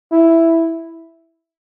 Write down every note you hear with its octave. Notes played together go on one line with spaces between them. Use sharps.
E4